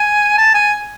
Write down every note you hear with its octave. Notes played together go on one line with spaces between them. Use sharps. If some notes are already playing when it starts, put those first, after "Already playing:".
Already playing: G#5
A5
G#5